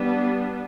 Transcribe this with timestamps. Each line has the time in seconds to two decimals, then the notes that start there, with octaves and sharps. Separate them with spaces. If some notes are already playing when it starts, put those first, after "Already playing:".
Already playing: G3 B3 D4